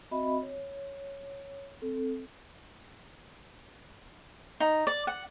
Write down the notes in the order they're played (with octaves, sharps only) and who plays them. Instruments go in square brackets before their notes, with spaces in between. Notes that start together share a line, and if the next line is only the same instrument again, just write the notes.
[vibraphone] C4 F#4 D#5 E5 B5
C#5
C4 A4
[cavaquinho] D#4
D5
F#5